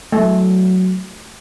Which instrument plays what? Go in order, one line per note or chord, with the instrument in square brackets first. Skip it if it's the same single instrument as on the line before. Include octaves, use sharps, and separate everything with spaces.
[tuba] F#3 [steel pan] A3